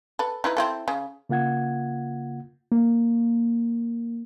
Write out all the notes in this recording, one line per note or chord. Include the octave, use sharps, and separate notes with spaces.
A4 B4
D#4 E4 B4
C4 E4 A4
C#3
C#3 A#3 F4 F#5 G#6
A#3